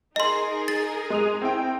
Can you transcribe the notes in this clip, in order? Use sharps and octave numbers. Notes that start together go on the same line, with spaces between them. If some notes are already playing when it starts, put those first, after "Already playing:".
D#4 G#4 A#4 D#5 C6
A6
G#3 D#6 F7
C4 E4 G5